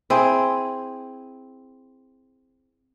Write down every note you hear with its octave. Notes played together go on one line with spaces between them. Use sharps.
C4 E4 G#4